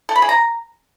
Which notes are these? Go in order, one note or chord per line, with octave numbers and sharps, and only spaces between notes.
A4
B5
G#4
A#5